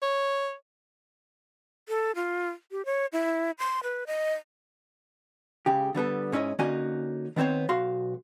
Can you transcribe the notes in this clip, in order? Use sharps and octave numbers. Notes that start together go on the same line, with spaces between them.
C#5
A4
F4
G4
C#5
E4
C6
B4
D#5
C#2 C#3 G4
D3 G3 B3 A4
G#2 C#4 E4 C#5 D#5
D3 A#3 C#4 D#4 F#4 G#5
D#3 B3 C4 C5 C#5
B1 F#4 F5 C6